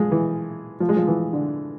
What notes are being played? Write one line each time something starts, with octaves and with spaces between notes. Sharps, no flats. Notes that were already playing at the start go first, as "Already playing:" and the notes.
Already playing: F3 G#3
E3
F3
G#3
F3
E3
D3